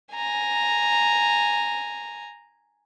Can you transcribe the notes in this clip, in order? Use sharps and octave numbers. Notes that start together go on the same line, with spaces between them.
G#5 A#5